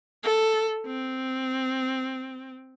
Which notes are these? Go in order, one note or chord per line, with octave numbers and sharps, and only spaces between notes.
A4
C4